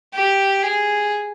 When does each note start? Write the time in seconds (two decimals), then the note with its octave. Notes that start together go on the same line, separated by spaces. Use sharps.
0.14 G4
0.62 G#4